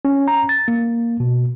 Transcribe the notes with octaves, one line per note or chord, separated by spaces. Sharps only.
C#4
A#5
A6
A#3
B2